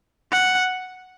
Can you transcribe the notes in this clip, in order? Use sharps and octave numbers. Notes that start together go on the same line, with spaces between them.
F#5